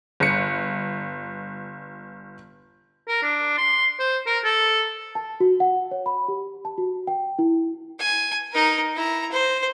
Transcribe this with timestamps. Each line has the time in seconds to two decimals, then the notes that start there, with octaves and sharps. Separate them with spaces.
0.20 G1 C#7
3.08 A#4
3.23 D4
3.58 C6
3.99 C5
4.27 A#4
4.45 A4
5.15 A5
5.40 F#4
5.60 F#5
5.91 C#5
6.06 B5
6.28 G4
6.65 A5
6.78 F#4
7.07 G5
7.39 E4
7.99 G#5
8.52 D#4 A#4
8.96 E4 A#5
9.32 C5